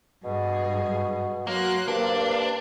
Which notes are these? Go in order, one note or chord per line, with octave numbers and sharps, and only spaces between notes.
G2 B2 G#4
F#3 A#3 C6 F#6
G2 A#3 D4 C5